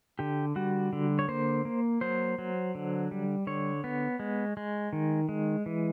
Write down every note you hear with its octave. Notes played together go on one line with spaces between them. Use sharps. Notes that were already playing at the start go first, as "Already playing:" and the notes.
D3 G4
G3 F#4
D3
C#5
A#3 C5
A#3
F#3 C5
F#3
D3
G3
D3 C#5
B3
G#3
G#3
D#3
G#3
E3